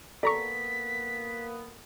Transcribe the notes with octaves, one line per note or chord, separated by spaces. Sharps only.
A#3 B3 A4 D5 A#5 C#6 B6